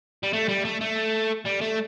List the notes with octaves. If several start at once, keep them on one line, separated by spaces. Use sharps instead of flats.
G3
A3
G3
A3
A3
G3
A3